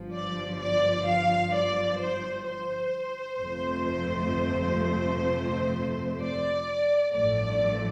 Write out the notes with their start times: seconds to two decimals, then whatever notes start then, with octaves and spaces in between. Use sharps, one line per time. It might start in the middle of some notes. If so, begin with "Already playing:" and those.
Already playing: G1 G2 F3
0.15 D5
0.61 D5
1.08 F5
1.55 D5
2.01 C5
2.48 C5
3.41 G1 F2 C3 F3 A3
6.21 D5
7.13 A1 G2 F3 A3 D5